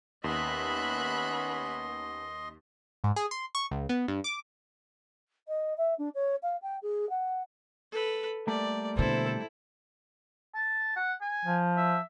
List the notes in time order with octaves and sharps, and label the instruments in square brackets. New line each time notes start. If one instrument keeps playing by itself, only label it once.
[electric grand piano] D#2 [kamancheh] B3 C#4 [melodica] D#5 C6 [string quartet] E5 B5 F#6
[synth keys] G#2
G#4
C6
C#6
C#2
B3
G2
D6
[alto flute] D#5
E5
D4
C#5
F5
G5
G#4
F#5
[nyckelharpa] A4 B4
[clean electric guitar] G3 A3 A#3 [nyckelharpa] D5
[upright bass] B2 D3 [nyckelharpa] E4 [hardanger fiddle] A4 C5
[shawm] A5
F#5
G#5
[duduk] F3
[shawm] E5